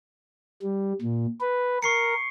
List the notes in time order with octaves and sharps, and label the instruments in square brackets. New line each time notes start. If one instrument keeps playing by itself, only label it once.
[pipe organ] G3
A#2
B4
[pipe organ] A#4 [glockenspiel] C#6 C7 C#7